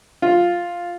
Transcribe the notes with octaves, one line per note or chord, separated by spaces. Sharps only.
F4